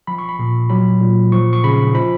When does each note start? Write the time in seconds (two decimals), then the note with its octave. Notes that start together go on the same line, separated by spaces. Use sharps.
0.07 F3 B5
0.19 C#6
0.29 B5
0.39 A#2
0.70 F#3 B5
1.01 A#2
1.32 F3 C#6
1.53 C#6
1.64 C#3 B5
1.94 F3 B5